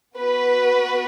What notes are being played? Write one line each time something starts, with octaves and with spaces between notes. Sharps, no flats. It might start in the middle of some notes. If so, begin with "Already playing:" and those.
B3 F#4 B4